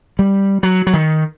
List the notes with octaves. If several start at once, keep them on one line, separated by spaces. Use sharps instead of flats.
G3
F#3
F#3
D#3